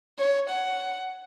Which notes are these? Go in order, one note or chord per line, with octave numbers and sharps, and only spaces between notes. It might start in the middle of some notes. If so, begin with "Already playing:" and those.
C#5
F#5